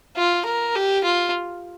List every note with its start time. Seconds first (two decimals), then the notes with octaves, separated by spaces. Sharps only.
0.17 F4
0.45 A#4
0.75 G4
1.04 F4